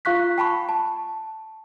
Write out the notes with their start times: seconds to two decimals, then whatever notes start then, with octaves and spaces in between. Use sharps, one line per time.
0.05 F4 F5 C#6 F#6 B6
0.38 G5 A5 B5 C#6
0.69 A5